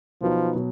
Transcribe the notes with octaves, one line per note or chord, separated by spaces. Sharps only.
B2 F3 F#3 B3 D#4
B2 F#3